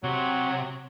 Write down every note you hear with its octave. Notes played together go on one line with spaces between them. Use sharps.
C3 F#3